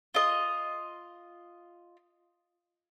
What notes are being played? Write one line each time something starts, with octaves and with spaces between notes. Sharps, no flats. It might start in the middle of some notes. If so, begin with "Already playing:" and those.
F4 D#5